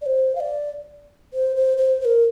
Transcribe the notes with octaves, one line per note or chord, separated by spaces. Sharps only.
D5
C5
F5
D5
C5
C5
C5
C5
A#4